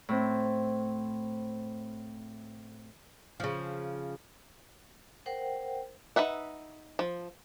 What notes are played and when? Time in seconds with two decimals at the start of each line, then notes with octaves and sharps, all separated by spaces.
0.09 A2 C4
3.40 C#3 F3
5.26 A#4 C5 F#5 G5
6.16 D#4 B4 E5 F#5
6.99 F3